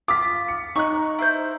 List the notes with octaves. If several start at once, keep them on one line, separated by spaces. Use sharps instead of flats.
F4 D6 B6
C#7
D#4 C#6 D#6 F#6
E4 C5 G6